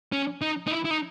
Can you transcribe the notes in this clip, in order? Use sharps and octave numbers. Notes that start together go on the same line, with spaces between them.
C#4
D#4
D#4
E4
E4
D#4